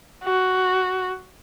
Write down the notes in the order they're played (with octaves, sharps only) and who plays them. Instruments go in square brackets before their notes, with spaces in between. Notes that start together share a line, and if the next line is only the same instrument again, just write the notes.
[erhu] F#4